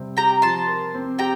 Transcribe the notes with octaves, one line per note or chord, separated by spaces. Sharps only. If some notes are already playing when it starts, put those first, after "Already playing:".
Already playing: C3 G3 C4
G4 G5 A#5
F3 A5 C6
A#4
C4
G4 G5 A#5